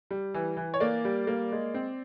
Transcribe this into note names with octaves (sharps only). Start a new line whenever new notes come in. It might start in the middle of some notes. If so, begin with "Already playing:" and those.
G3
E3
E3
C#5
A#3 D5
G3
A#3
G#3
C4